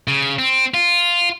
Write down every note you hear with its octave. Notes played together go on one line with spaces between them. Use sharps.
C#3
C4
F4